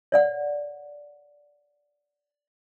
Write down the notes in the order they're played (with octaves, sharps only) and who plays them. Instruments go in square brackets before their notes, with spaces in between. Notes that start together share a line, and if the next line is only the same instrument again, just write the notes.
[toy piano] C#5 D5 F#5